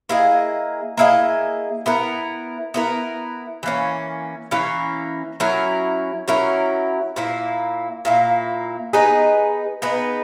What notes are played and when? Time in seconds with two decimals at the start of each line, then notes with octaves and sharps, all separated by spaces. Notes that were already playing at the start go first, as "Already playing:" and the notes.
0.09 A#3 E4 G#4 D#5
0.97 A#3 E4 G#4 D#5
1.86 B3 E4 A#4
2.74 B3 E4 A#4
3.63 E3 A#3 C#4
4.51 E3 A#3 C#4
5.40 F#3 C#4 E4 A#4
6.28 F#3 C#4 E4 A#4
7.16 A#2 A#3 E4
8.05 A#2 A#3 E4
8.93 B3 D#4 G#4 B4
9.82 B3 D#4 G#4 B4